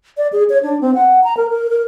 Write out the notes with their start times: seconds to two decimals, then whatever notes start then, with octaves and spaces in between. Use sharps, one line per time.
0.17 D5
0.33 G#4
0.50 C#5
0.63 D4
0.81 C4
0.94 F#5
1.24 A#5
1.37 A#4
1.50 A#4
1.70 A#4